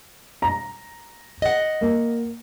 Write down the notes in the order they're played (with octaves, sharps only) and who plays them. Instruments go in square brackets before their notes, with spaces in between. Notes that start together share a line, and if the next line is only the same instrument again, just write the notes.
[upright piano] A#5
[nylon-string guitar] D#5 F#5
[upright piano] A#3